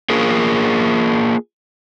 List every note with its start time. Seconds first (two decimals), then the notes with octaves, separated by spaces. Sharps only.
0.10 A#3 F4 G#4 A#4